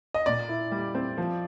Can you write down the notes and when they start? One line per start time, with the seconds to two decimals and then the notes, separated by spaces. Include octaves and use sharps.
0.14 D#5
0.26 A#2 D5
0.49 E4
0.72 G3
0.95 C4
1.18 F3